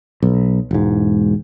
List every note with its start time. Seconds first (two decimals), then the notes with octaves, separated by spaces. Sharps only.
0.23 B1
0.71 E1 G#2